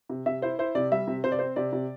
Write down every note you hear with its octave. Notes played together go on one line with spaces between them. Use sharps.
C3
C3 E5
E4 C5
E4 C5
C3 D5
G3 E5
C3
C3 C5
D5
C4 C5
C3 D5
C3